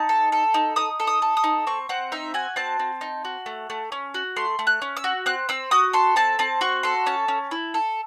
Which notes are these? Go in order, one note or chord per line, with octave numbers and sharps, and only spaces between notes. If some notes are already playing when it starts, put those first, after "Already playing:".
Already playing: D#4 A5
A4
A4
D#4
D#4 D#6
A4
D#6
A4
D#6
D#4
C4 C#6
C4 F#5
D#4 E5
F#4 G#5
C4 A5
C4
D#4
F#4
A3
A3
C#4
F#4
A3 C6
A3
F#6
C#4
E6
F#4
C4 F#6
C4 E6
F#4 D#6
A4 C6
C4 A5
C4 A5
F#4 C#6
A4 C6
C#4 A5
C#4
E4
A4